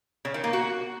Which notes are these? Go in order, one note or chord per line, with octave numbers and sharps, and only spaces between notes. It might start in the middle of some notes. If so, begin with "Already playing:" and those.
C#3
D#3
A#3
F#4